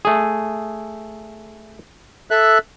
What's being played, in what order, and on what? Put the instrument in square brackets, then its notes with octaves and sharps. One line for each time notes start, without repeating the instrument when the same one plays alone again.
[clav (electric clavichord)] A3 G#4
[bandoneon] A4 E5 F#6